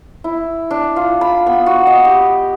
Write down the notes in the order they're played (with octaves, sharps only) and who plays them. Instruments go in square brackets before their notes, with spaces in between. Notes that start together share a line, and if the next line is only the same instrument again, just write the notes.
[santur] E4
D4
F4
B5
B3
F#4
D#5
G4